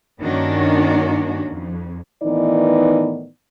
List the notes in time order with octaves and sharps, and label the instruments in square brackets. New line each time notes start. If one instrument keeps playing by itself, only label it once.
[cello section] G2 D#3 A#3 C#4 D4 F#4
F2
[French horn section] A2 D#3 E3 B3 D#4 D5